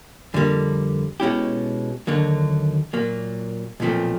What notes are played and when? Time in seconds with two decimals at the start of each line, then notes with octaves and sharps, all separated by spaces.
0.34 F2 D3 G3 A#3
1.20 B2 G#3 C#4 E4 G4
2.07 D#2 D3 F#3 A#3
2.93 A#2 F#3 A#3
3.80 B1 A#2 F3 A3 C4